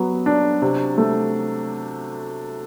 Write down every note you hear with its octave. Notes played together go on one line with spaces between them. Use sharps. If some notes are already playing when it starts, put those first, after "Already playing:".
Already playing: F#3 B3
D4
C3
A3